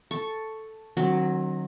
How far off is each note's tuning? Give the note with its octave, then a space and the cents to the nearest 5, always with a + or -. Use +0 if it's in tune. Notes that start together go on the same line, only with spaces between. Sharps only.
A4 +0 C#6 +0
D#3 -35 F#3 +0 C4 +35